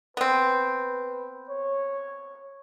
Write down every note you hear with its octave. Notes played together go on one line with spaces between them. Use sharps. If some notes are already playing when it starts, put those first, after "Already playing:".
B3 C4 B4
C#5